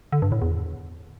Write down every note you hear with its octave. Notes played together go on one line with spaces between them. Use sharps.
D3
G2
A2
E2